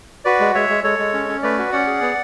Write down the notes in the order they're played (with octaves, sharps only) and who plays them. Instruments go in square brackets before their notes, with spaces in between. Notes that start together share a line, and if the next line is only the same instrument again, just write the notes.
[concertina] F#4 B4 D5
G#3
G#3 C#5 E5
G#3
G#3 A4 C#5
G#3
C#4
C#4
A3 B4 D5
F#4
C#4 D5 F#5
G#4
B3